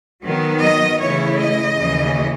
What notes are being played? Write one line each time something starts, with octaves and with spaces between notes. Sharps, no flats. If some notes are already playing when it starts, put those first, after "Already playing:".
D#3 F#3 B3
D#5
C#3 E3 A3 E4 C#5
D#5
D#2 C#3 E3